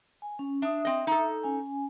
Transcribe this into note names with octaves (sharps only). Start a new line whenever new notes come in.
G#5
C#4
D4 E5 D#6
C4 D#5
D#4 A4
C#4 G#5